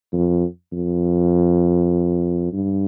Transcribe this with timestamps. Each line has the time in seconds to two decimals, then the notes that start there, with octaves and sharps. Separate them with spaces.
0.13 F2
0.72 F2
2.53 G2